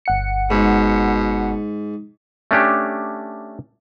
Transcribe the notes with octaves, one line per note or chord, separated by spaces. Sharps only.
G1 F#5 C#7
G#2 B2
A3 C#4 D4 G4